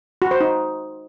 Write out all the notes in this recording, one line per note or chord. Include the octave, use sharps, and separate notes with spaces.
F#4
C5
D#4